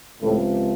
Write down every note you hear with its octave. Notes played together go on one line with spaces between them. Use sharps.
C#2 A2 C3 F3 A3